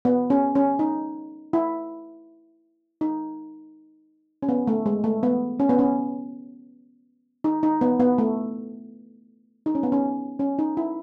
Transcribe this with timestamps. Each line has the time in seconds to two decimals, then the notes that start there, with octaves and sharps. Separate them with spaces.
0.05 B3
0.30 C#4
0.55 C#4
0.79 D#4
1.53 E4
3.01 D#4
4.42 C#4
4.49 B3
4.67 A3
4.86 G#3
5.04 A3
5.23 B3
5.60 C#4
5.69 B3
5.79 C#4
7.44 D#4
7.63 D#4
7.81 B3
8.00 B3
8.18 A3
9.66 D#4
9.75 C#4
9.83 B3
9.92 C#4
10.40 C#4
10.59 D#4
10.77 E4